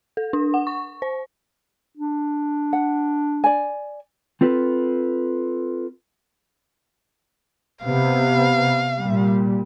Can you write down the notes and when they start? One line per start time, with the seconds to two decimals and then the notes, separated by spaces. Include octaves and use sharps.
0.17 A4
0.33 D4
0.54 F#5
0.67 C#6
1.02 C5
1.97 D4
2.73 F#5
3.44 D5 G#5
4.41 C4 F4 A4 B4
7.84 C3 B3 F5
8.98 A#2 G3